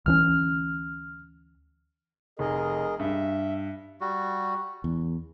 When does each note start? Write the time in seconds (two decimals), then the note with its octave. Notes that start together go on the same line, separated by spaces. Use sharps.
0.06 D2 E3 C#4 F6
2.39 F1 G#4 A#4 D#5
2.99 G2 E5
4.01 G3 F#4
4.84 E2